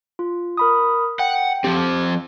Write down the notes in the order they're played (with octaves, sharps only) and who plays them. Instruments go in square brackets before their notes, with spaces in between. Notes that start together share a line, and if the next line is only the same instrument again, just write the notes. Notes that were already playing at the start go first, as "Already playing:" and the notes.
[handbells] F4
A#4 B5 D#6
[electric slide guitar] F#5 [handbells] G5
[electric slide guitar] F3 C4 [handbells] G4